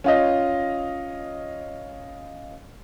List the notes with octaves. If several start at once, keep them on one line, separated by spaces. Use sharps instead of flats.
C#4 F4 D#5